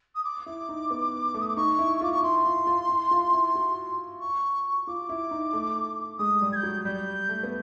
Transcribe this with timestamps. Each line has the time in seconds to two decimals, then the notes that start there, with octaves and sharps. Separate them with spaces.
0.15 D#6
0.24 D6
0.46 E4
0.69 D#4
0.91 B3
1.34 A3
1.41 D#6
1.48 D6
1.57 D#4 C#6
1.79 E4
2.01 F4 D6
2.12 C#6
2.23 E4 C6
2.45 F4
2.67 F4
2.89 E4
3.11 F4
3.33 E4
3.55 F#4
4.20 C#6
4.87 F4 D6
5.09 E4
5.31 D#4
5.53 A3
6.19 G#3 D#6
6.41 G3
6.52 G#6
6.56 G6
6.63 F#3
6.85 G3 G6
7.29 A3
7.43 B3